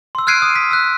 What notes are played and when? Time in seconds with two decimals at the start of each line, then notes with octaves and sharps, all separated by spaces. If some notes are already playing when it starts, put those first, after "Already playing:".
0.15 C6 E6
0.27 F6 F#6 G#6 C7 D7 D#7
0.42 D#6
0.56 B6
0.71 E6 F#6